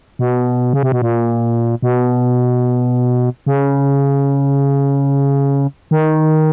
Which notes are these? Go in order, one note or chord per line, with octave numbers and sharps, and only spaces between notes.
B2
C#3
C3
B2
A#2
B2
C#3
D#3